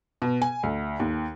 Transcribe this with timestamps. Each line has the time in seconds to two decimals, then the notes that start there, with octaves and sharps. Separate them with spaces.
0.22 B2
0.42 G#5
0.63 D2
1.00 D#2